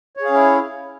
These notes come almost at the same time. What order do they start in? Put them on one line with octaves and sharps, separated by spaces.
C#5 G#4 F5 C#4 E4